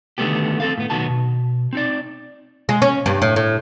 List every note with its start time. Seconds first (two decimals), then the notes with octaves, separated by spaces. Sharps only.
0.18 D3 D#3 G#3 A3 B3 G4
0.60 C4 A4 F5
0.78 A2 B3
0.90 B1 D#3 B3 F#4 A5
1.10 B2
1.73 C4 D#4 D5
2.69 G#3
2.82 C#4
3.06 G2
3.22 A2
3.36 A2